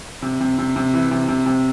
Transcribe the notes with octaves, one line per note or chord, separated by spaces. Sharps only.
C3
C3
C3
C3
E3
C3
C3
C3